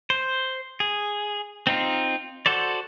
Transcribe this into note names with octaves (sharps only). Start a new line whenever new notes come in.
C5
G#4
C4 D#4 F4
F#4 A4 C5 D5